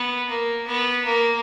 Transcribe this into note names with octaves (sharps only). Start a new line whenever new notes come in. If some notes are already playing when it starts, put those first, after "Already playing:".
Already playing: B3
A#3
B3
A#3